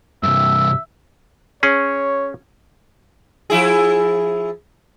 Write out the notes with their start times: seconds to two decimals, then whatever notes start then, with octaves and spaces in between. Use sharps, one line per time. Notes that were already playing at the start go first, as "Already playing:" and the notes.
0.23 G2 C3 E5
1.63 C#4 G#4 C#5
3.50 F3 E4 G#4